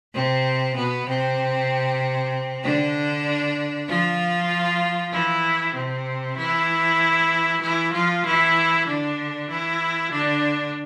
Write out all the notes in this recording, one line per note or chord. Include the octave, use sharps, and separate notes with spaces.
C3 C4
B2 B3
C3 C4
D3 D4
F3 F4
E3 E4
C3 C4
E3 E4
E3 E4
F3 F4
E3 E4
D3 D4
E3 E4
D3 D4